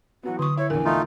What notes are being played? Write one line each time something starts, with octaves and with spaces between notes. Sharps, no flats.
E3 F#3 B3 F#4
D3 C#6 D#6
E4 C#5
A#1 E2 A#4 G#5
A3 D#4 F4